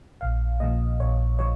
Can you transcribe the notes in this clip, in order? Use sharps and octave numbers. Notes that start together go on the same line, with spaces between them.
A#1 F5
A#2 F3 D#5
A#1 C#5
F3 C#5